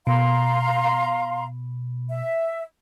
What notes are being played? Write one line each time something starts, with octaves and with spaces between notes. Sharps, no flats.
B2 F5 A#5 C6
E5